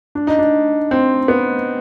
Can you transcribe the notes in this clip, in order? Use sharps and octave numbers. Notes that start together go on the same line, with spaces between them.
D4
D#4
D4
C4
B3